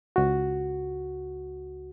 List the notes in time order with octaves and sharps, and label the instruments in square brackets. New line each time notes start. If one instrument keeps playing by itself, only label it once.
[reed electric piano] C#2 F#4